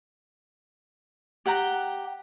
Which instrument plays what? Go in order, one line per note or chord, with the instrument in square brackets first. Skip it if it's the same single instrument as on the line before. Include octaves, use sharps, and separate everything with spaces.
[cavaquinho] G4 F#5 G5 A#5